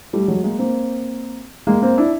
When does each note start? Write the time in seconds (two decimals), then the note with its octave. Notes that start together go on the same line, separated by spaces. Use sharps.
0.13 G3 A3
0.28 F#3 G#3
0.44 G#3 A#3
0.59 A#3 C4
1.67 G#3 A#3
1.82 A#3 C4
1.97 D4 E4